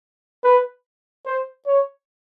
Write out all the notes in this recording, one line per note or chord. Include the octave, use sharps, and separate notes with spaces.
B4
C5
C#5